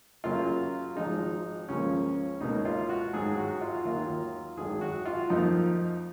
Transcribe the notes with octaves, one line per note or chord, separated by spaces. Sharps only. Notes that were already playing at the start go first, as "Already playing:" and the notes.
F#2 C#3 F#3 A#3 F4
G#1 G#2 F3 G#3 D#4
C#2 C#3 F3 A#3 C#4
C#2 B2 A#3 D#4
F4
F#4
G#2 D#3 F#3 G#4
F#4
F4
D#2 D#3 F#3 A#3 F4
G#1 F#2 D#3 G#4
F#4
F4
F2 F3 A#3 D#4